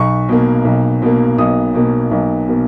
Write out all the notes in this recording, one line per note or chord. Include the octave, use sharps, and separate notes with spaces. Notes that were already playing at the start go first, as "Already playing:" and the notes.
Already playing: B1 C#6
B2 A#3
B1
B2 A#3
B1 D#6
B2 A#3
B1
B2 A#3